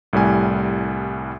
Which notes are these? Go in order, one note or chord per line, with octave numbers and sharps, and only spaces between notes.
C2 A2 G3 G#5